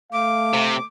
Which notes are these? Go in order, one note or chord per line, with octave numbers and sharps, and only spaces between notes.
A3 F5 D6
C3